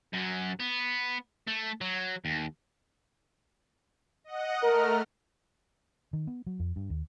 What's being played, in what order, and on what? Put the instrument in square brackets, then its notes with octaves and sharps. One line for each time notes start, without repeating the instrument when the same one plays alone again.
[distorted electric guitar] F#2 F#3
B3
A3
F#3
D#2
[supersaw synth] D#5 F#5
[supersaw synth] A3 F6 [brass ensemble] A#4
[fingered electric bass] D#3
B3
F#3
F2
G2
D#2